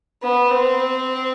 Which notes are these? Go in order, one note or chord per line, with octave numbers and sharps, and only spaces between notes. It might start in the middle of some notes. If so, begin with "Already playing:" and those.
B3
C4